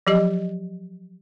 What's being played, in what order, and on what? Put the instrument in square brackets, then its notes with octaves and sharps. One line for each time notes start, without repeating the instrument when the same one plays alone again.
[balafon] F3 F#3 G4 D#5